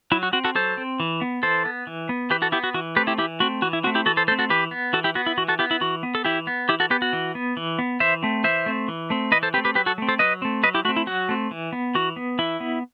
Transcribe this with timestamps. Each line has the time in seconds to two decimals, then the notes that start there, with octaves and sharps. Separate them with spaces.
0.12 F#3 E4
0.23 F#4
0.33 C4 F#4
0.44 F#4 A4
0.55 F#3 A4 C5
0.77 C4
1.00 E3
1.21 B3
1.43 E3 A4 C5
1.65 B3
1.87 E3
2.09 B3
2.30 E3 G4 B4
2.42 F#4 A4
2.52 B3 E4 G4
2.64 F#4
2.74 E3 F#4
2.96 A3 C4 G4 B4
3.07 E4 G4
3.18 E3 E4 G4
3.40 A3 C4 F#4
3.62 E3 F#4
3.73 E4
3.84 C4 F#4
3.87 A3
3.95 E4 G4
4.06 E3 F#4 A4
4.17 A4 C5
4.28 A3 A4 C5
4.32 C4
4.39 F#4 A4
4.50 E3 G4 B4
4.71 B3
4.93 E3 F#4 A4
5.04 E4 G4
5.15 B3 F#4
5.26 E4
5.38 E3 F#4
5.48 F#4 A4
5.59 B3 E4 G4
5.71 E4
5.81 E3 F#4
6.03 B3
6.15 A4
6.25 E3 E4 G4
6.47 B3
6.69 E3 E4 G4
6.80 F#4 A4
6.90 B3 G4 B4
7.02 F#4
7.13 E3
7.35 B3
7.57 E3
7.79 B3
8.00 E3 C5 E5
8.23 A3 C4
8.44 E3 C5 E5
8.66 A3 C4
8.88 E3
9.10 A3 C4
9.32 E3 B4 D#5
9.43 A4 C5
9.54 C4 G4 B4
9.58 A3
9.65 G4 B4
9.75 F#3 G4 B4
9.86 F#4 A4
9.98 A3 C4
10.09 A4 C5
10.19 F#3 B4 D#5
10.42 A3 C4
10.63 F#3 B4 D#5
10.74 E4 G4
10.85 A3 F#4
10.89 C4
10.96 E4
11.07 F#3 F#4
11.29 A3 C4
11.51 E3
11.73 B3
11.95 E3 F#4
12.16 B3
12.39 E3 E4
12.60 B3